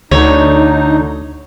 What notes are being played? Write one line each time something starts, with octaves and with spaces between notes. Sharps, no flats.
D2 D3 D#4 C#5